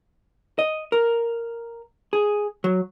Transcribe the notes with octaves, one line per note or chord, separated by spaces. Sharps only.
D#5
A#4
G#4
F#3